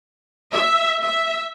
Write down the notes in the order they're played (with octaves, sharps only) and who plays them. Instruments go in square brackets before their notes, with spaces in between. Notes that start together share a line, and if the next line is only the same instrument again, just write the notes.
[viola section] E5
E5